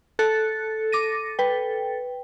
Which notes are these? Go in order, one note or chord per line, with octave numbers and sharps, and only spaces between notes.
A4 F#6 A6 C#7
D6 A#6 D#7
B4 G5